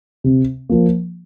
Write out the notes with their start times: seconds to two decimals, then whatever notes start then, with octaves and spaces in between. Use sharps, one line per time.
0.24 C3
0.69 F3 A#3